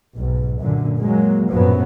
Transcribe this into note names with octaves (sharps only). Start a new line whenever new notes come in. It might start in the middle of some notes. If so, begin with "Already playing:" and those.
B1 G#2
F#2 A#2 D3
F#3 G#3 A#3
A#1 F#2 A2 F3 F#3 B3